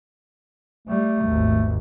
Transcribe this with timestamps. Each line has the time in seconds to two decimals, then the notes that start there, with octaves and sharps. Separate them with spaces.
0.88 G3 A3
1.25 G#1 D#2